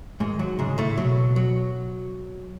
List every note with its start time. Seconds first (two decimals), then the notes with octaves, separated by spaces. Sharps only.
0.20 G#2 D#3 G#3
0.39 F#3
0.58 G#2 C#3 G#3
0.78 A2 A3
0.97 B2 F#3
1.36 F#3